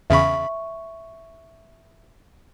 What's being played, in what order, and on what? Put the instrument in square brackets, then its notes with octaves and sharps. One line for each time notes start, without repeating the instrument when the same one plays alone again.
[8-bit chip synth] E2 C#3 B5 [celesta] E5 C#6